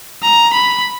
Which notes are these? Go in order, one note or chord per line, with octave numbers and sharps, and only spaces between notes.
A#5
B5